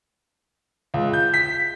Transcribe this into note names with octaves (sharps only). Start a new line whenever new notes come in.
C#2
G6
B6